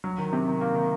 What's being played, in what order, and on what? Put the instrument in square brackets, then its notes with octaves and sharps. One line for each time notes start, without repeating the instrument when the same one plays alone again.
[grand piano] F#3
D#3
C3
D#3
A#3
D#3